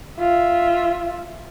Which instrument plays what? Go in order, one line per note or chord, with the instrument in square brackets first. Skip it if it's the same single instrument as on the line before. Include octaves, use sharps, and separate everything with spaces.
[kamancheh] F4 E5